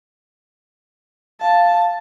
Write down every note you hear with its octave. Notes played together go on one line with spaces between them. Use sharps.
F5 A5